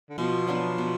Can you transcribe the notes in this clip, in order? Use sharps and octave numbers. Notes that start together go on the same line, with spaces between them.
D3
B2 F3
F#3 B3 D4
B2